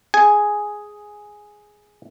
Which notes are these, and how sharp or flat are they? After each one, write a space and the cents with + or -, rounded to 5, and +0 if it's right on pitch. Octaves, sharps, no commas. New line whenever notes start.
G#4 +0 G#5 +0